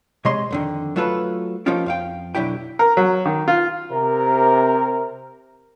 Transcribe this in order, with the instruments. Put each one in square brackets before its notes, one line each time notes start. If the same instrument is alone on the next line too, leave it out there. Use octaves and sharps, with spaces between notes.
[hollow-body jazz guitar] C3 G#3 C#5 D#5 C6
F2 D3 D#3
F#3 A3 F4 A4 B4
F3 A#3 C#4 D#4 F4 G4
F2 F5 G5
B1 D3 F#3 E4 G4 G5
[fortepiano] A#4
F#3
D#3
F4
[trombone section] C3 A#4